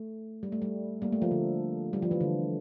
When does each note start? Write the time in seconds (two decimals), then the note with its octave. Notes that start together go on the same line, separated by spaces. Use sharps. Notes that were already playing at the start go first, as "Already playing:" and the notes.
Already playing: A3
0.43 G3
0.52 A3
0.62 G3
1.02 G3 A#3
1.12 A3
1.22 F3
1.31 D3
1.93 G3
2.02 F3
2.11 E3
2.21 D3